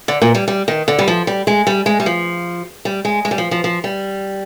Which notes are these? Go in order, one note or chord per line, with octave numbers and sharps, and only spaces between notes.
D3
A#2
G3
G3
D#3
D3
G3
F3
G3
G#3
G3
G#3
G3
F3
G3
G#3
G#3
G3
F3
F3
F3
G3